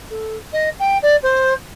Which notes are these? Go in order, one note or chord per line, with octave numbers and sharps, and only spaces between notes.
A4
D#5
G5
D5
C5